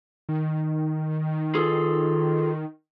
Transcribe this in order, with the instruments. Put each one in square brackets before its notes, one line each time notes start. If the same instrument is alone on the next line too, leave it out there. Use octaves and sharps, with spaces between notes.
[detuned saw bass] D#3
[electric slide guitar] F4 G#4 A4